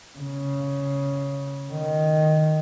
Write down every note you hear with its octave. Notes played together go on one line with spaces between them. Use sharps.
C#3
D#3